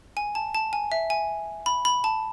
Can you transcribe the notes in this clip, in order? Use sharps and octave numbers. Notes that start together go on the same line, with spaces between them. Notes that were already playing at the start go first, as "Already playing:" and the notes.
G#5
A5
A5
G#5
E5
G#5
B5
B5
A5